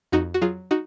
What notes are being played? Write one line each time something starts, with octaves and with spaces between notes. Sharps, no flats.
F2 D#4 F#4
F#4
F#3 F4 G#4
D#4 F#4